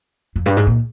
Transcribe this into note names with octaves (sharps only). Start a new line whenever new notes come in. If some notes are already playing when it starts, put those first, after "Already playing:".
F2
G2
G#2
A#2